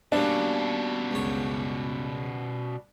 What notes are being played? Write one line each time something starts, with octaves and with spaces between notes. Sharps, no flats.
B2 G3 A#3 C#4 D4 A4
C#2 F#2 C#5